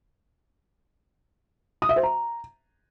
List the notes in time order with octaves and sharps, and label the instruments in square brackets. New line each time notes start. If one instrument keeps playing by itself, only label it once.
[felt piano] D#6
E5
C5
A#5